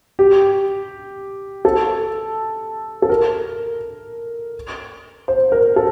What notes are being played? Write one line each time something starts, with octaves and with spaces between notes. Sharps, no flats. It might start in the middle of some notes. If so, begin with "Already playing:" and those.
G4
A4
A4
A#4
C5
A#4
A4